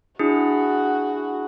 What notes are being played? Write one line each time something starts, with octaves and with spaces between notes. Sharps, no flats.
D4 E4 F#4 G#4